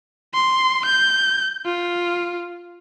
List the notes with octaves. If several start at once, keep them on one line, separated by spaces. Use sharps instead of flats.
C6
G6
F4